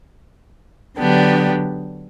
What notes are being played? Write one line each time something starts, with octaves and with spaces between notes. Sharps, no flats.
D3 F#3 B3 D4 G4